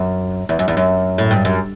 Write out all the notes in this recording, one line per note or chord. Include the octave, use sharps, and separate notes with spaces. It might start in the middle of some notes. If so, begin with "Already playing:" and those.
Already playing: F#2
E2
F#2
E2
F#2
A2
G2
F#2